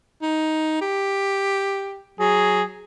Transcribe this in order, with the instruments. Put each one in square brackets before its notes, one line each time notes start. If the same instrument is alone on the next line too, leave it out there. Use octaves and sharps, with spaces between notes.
[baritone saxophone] D#4
G4
[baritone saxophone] F#3 [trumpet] G#4